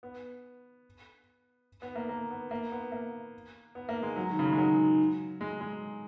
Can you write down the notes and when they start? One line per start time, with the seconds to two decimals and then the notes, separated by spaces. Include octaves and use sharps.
0.03 B3
1.82 B3
1.96 A#3
2.09 A#3
2.31 B3
2.51 A#3
2.72 B3
2.92 A#3
3.75 B3
3.89 A#3
4.03 G#3
4.16 F#3
4.30 D#3
4.39 C#3
4.44 D#3
4.52 G#3
4.57 F#3
5.41 G#3
5.61 G#3